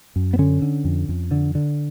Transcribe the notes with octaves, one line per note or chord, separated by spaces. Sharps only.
F#2
B3
D3 C#4
D3
F2
F2
D3
D3